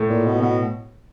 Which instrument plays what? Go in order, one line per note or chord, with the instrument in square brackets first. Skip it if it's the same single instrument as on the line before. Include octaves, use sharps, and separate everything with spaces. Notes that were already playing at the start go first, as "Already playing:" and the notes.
Already playing: [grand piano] A2
[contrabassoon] A#2
B2
B2